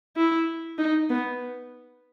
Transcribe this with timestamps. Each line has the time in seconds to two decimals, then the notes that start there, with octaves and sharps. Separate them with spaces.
0.16 E4
0.78 D#4
1.09 B3